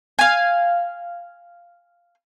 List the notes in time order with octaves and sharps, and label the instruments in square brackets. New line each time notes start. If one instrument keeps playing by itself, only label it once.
[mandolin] F5 G#5